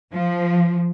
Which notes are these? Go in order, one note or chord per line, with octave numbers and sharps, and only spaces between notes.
F3